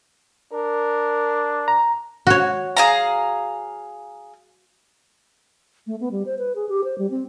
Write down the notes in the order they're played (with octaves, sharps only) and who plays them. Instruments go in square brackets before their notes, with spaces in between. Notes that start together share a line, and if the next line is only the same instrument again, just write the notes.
[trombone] D4 [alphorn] A#4
[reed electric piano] A#5
[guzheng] F#4 C#5
[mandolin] G#4 F5 A#5
[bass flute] A3
B3
G3
C5
B4
G#4
G4
C5
G3
C4